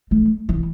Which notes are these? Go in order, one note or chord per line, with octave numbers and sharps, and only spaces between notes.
A3
E3